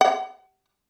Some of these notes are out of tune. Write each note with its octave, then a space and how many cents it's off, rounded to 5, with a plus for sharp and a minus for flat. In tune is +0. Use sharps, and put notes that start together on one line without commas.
F#5 +35